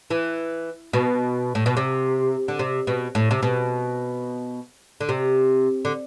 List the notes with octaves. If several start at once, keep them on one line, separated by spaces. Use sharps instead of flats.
E3
B2
A2
B2
C3
D3
C3
B2
A2
C3
B2
D3
C3
D3